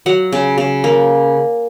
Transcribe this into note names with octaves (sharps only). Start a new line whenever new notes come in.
F#3 F#5
C#3
C#3
A#3